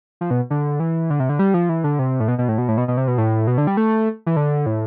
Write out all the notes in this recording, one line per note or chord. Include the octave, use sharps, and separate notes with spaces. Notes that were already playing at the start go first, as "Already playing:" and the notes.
F3
B2
D3
E3
D3
C3
D3
G3
F3
E3
D3
C3
A2
B2
B2
A2
B2
A2
B2
B2
C3
B2
A2
B2
D3
G3
A3
E3
D3
A2